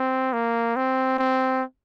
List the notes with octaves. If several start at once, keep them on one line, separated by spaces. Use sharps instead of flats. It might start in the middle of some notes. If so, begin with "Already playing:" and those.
Already playing: C4
A#3
C4
C4